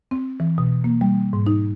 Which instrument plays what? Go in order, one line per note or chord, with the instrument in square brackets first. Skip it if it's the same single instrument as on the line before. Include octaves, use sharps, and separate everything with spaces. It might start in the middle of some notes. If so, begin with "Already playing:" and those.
[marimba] C4
E3
B2
A#3
G3
G#2
D#4